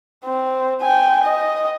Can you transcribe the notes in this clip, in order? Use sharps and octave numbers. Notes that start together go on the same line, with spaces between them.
C4
G5 G#5
D#5